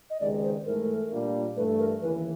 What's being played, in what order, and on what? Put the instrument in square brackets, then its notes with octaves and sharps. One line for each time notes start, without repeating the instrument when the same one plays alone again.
[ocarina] D#5
[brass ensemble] C#2 C3 D#3 G#3 [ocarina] D5
[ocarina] C5
[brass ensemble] G#2 E3 A3 [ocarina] A#4
[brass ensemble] A#2 G3 A#3 D4 F4
[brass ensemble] G2 E3 A3 [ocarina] B4
[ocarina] A#4
[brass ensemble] D#2 C#3 E3 [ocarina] B4